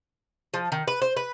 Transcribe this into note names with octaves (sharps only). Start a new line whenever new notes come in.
F3
D#3
B4
C5
B4